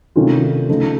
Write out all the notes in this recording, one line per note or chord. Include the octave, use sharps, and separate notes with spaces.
C3 D#3 A3 C#4 F4
C#3 F3 A3 D#4